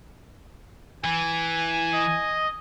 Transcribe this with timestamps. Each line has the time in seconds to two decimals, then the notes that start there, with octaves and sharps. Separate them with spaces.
1.04 E3 G#5
1.93 D#5